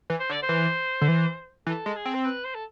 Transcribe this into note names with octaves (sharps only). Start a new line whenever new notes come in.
E3
C5
D3 D5
C5
E3
D3
E3
E3 A4
G#3
G#4
C4
C5
B4
C5
A4